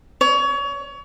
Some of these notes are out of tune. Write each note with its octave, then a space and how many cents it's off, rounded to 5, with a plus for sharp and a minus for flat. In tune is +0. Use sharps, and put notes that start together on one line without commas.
C#5 +30